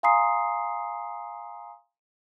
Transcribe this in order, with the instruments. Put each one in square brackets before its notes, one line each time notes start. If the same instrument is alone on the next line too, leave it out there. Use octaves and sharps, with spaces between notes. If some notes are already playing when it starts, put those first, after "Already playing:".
[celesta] F5 G#5 A#5 C6 D#6 C7